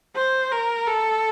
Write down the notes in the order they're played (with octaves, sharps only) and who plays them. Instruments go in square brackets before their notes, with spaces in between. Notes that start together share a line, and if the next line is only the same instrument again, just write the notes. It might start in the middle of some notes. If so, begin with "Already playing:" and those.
[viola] C5
A#4
A4